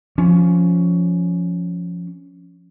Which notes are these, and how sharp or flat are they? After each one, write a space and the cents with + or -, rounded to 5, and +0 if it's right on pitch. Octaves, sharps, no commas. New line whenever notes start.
F3 +0 C#4 +15